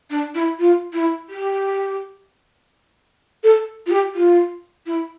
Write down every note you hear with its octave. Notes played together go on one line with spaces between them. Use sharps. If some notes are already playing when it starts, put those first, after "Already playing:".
D4
E4
F4
E4
G4
A4
F4
G4
F4
E4